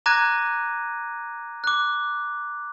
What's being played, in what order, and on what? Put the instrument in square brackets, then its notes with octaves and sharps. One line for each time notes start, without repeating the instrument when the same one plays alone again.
[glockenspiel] A#5 D6 F#6 G#6 A#6 D#7
D6 F#6